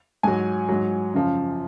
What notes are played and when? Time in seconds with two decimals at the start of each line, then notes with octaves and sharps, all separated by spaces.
0.23 G#2 F#3 G#5
0.68 G#2 F#3
1.14 F#2 C#3 F3